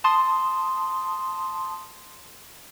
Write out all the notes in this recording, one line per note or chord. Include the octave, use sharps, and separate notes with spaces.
A5 C6 D#6